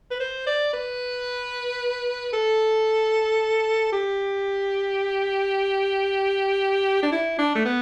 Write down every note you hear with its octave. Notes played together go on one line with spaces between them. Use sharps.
B4
C5
D5
B4
A4
G4
D4
E4
D4
A3
B3